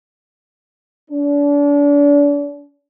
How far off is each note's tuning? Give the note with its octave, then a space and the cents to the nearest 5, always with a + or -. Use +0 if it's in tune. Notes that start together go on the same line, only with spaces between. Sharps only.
D4 -35